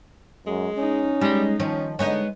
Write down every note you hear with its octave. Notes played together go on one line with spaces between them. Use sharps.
F#2 G#3
C#4 D#4
G3 G#3
D#3 F3 C#4 C#5
D3 G#3 B3 D#4 C#5